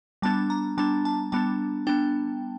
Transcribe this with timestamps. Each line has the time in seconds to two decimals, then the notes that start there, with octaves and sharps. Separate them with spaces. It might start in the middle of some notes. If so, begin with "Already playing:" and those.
0.22 G3 B3 D4 A5
0.50 A#5
0.78 G3 B3 D4 A5
1.05 A5
1.32 G3 B3 D4 A5
1.87 B3 D4 G5